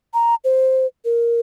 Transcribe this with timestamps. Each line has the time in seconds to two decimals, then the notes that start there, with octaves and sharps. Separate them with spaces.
0.14 A#5
0.44 C5
1.05 A#4